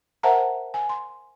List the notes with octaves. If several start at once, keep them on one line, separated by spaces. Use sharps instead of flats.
A#4 C5 E5 F#5 A5 A#5
G#5
C6